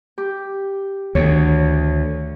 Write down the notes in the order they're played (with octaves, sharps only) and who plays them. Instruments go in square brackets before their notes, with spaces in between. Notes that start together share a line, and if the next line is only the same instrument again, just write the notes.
[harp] G4
[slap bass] D2 [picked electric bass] D#3 [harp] C#5